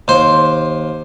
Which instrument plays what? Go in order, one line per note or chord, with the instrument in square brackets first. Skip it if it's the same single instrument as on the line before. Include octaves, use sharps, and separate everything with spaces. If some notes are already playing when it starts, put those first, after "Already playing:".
[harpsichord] D#2 C5 C6